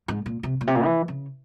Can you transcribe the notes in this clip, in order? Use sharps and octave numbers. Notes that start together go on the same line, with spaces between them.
G#2
A#2
C3
A#2
C3
A#2
E3
C#3